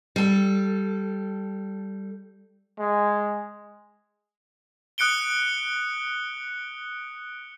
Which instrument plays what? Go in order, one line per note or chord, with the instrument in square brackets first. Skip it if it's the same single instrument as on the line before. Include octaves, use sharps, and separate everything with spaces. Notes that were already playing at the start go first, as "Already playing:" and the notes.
[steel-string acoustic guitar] G3 A4
[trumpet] G#3
[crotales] D#6 F#6 C#7 D7 G7